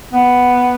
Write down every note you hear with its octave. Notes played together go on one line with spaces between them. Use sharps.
B3